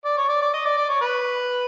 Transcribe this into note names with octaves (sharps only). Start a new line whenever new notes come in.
D5
C#5
D5
D5
D#5
D5
D5
C#5
B4